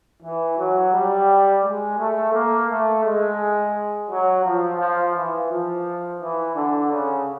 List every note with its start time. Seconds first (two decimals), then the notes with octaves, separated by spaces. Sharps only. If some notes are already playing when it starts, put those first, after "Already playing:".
0.23 E3
0.58 F#3
0.93 G3
1.64 G#3
1.98 A3
2.34 A#3
2.69 A3
3.04 G#3
4.09 F#3
4.45 F3
4.80 F3
5.15 E3
5.51 F3
6.21 E3
6.56 D3
6.91 C#3